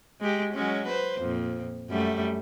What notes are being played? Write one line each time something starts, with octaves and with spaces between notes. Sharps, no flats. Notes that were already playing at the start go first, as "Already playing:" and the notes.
G#3 G4
F#3 G#3 C#4
B4 C5
F2 A#2
F#2 G3 A3